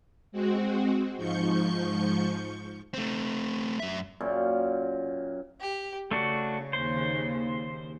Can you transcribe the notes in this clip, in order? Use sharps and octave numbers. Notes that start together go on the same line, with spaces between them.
G#3 C4 F#4
G#2 F3 C#6 G6 C#7
A3 C4
F#2 E5
F#2 A#2 G5
G4
C#3 A3 D4 F#4
D#2 C5